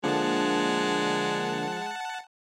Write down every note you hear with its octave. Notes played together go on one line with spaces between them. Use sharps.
D3 F3 G#3 A#3 D4 F#5 A5